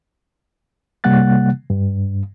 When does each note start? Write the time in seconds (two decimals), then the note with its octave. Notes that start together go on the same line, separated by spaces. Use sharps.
1.04 C3 G3 A#3 F#5 F#6 A6
1.70 G2